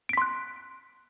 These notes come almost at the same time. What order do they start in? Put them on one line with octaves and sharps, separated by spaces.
D7 B6 C6 F#6